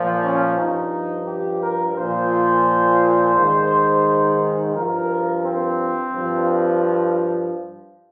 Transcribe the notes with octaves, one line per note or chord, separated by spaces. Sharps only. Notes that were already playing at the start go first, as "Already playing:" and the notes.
Already playing: A#2 F3
C#4
G2 F3 D#4
G4
A#4
A#2 F3 C5
G#2 D#3
G2 F3 A#4
C4
G2 F3